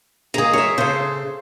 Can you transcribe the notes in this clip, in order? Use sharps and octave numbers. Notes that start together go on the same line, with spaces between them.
G#3 A#3 G#4 A#5
A#4 C#5 E5
C#3 A4 C5